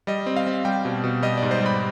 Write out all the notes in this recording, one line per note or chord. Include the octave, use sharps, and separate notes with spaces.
G3 D#5
C4
F5
C4
G3 G5
B2
B2
G3 D#5
G#2 D5
C5
G3
B5